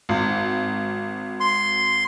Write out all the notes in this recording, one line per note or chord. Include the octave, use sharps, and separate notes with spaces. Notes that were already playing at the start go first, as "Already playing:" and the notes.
G#1
C6